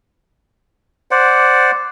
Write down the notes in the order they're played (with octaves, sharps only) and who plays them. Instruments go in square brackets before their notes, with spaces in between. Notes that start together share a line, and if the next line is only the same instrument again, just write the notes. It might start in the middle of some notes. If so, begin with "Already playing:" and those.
[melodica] C5 D5 F#5